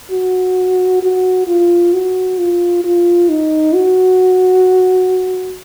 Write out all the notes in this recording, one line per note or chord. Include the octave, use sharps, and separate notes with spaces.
F#4
F#4
F4
F#4
F4
F4
D#4
F#4